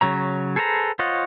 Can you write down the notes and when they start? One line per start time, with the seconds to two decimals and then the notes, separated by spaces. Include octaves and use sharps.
0.01 C#3 F#3 C#5 A#5
0.56 G#4 A4 B4 C5 A#5
0.99 F4 C5 C#5 D#5 F#5